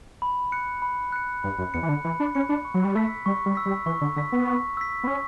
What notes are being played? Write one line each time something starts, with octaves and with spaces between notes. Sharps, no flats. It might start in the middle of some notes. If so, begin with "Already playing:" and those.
B5
F#6 C#7
B5
F#6 C#7
G2 B5
F#2
E2 F#6 C#7
E3
D3
E3 B5
D4
C#4 F#6 C#7
D4
C#6
F#3
G3
A3 E6 B6
G3 C#6
G3
E6 B6
G3
E3 C#6
D3
D3 E6 B6
B3
C#6
E6 B6
B3
C#4 C#6